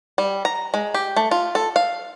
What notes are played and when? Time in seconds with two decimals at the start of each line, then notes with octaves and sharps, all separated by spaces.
0.18 G3
0.45 A#5
0.74 G#3
0.94 G4
1.16 A3
1.31 F4
1.55 A4
1.76 F5